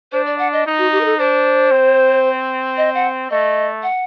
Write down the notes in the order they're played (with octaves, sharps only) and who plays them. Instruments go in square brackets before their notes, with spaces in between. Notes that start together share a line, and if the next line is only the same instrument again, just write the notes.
[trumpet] D4 [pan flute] C5
[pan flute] D5
F#5
D#5
[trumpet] D#4
[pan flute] F#4
G4
A#4
A4
[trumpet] D4 [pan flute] C5
[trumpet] C4
[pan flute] D#5
F#5
[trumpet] A3 [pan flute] D#5
[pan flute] F#5